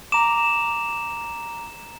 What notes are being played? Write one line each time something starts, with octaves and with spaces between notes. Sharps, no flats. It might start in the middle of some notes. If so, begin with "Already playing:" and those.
A#5 D6 E7